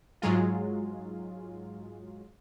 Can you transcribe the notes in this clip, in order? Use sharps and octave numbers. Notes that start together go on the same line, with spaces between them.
G#2 F#3 G#3 F4